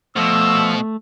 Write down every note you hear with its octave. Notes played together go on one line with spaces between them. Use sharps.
B2 F3 A3 E6